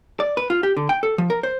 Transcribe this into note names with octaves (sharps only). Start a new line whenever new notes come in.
D5
B4
F4
G4
D3
G5
A4
F3
A#4
C5